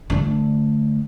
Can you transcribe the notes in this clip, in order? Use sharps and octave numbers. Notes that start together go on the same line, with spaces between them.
D3 A3